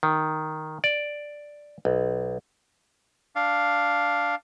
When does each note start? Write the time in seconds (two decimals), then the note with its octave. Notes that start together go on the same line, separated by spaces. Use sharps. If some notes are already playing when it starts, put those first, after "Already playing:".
0.03 D#3
0.84 D5
1.85 B1
3.36 D4 F5